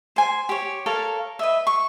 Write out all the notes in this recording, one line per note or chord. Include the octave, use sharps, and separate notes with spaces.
C5 G#5
G4 C#5
A4 A#4 C#5 F5
B4 D#5 E5
C#6